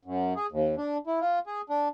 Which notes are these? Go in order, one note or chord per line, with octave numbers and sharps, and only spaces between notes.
F#2
G#4
D#2
D4
E4
F4
G#4
D4